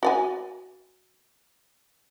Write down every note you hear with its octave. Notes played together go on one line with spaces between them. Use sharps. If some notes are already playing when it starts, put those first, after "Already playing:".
F#4 D5 G#5